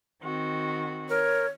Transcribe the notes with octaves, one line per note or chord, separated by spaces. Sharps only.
D#3 C4 F#4
A#4 C#5